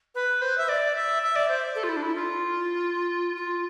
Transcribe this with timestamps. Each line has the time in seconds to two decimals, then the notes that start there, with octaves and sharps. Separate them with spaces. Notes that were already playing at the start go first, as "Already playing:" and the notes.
0.15 B4
0.42 C5
0.58 E5
0.69 D5
0.95 E5
1.23 E5
1.36 D5
1.49 C5
1.75 A4
1.84 F4
1.89 E4
1.97 D4
2.02 E4
2.15 F4
3.36 F4